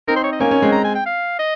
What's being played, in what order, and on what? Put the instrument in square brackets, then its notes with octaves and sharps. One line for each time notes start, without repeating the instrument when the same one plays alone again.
[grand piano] C4 D#4 [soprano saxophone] A#4
[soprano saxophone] C5
C#5
D#5
[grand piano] A#3 C#4 [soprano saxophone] G#5
[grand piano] A#3 C#4
G#3 C4
[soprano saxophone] A#5
G#5
G5
F5
D#5